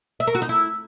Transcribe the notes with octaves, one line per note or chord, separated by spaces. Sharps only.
E5
A#4
F#4
D#4
E4